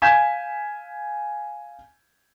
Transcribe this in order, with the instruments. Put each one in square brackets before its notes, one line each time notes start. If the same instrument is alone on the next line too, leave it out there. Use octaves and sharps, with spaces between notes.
[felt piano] F5 G#5 G6 G#6 B6 E7